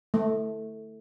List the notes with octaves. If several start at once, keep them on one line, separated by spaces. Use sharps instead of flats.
A3